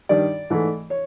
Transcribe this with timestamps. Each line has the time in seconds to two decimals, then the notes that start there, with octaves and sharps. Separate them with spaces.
0.09 G2 D#3 G3 D5
0.50 G#2 E3 A3
0.90 C#5